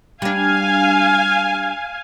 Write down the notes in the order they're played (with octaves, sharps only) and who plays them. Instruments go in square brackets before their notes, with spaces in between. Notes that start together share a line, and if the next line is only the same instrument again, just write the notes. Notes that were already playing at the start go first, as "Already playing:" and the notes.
[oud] G3 D4 [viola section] F5 G#5